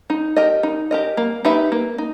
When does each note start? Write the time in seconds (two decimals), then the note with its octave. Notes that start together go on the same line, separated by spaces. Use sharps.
0.10 D#4
0.36 G4 A#4 D#5
0.63 D#4
0.91 G4 A#4 D#5
1.17 A#3
1.45 D#4 G4 B4 E5
1.72 A#3
1.98 D#4